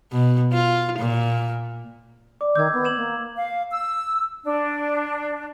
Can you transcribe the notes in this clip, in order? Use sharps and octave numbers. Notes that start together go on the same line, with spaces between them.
B2
F4
A#2
D5 D6
D#3 D6 E6 G6 G#6
B3
G#6 E7 F#7
A#3
F5
E6
D4